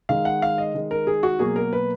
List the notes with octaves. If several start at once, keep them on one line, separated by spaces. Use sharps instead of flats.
D#3 G#3 F5
F#5
F5
D#5
D#3 G#3
A#4
G#4
F#4
B2 F#3 A#3 G#4
A#4
B4